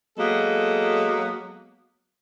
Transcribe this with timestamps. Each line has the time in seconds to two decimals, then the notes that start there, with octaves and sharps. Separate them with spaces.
0.18 F#3 G#3 A#3 B3 A4